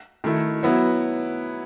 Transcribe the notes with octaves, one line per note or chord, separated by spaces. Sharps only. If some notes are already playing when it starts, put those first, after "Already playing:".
D#3 A3 E4
F#3 B3 E4